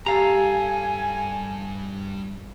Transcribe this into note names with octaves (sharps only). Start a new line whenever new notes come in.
G2 G4 A4 F5 G#5 A#5